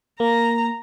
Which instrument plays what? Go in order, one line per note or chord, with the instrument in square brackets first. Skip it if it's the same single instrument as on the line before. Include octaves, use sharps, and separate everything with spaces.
[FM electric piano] A#3 [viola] A#5